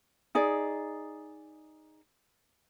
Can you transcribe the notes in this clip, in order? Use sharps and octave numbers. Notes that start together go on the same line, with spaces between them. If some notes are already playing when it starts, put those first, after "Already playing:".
D#4 G#4 D5